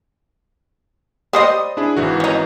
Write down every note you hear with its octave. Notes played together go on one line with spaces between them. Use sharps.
G3 C5 D#5 D#6
D4 E4 G#4
G#1 E3 F#4
C#4 D#4